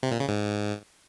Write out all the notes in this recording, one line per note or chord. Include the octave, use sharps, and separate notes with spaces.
C3
A#2
C#3
G#2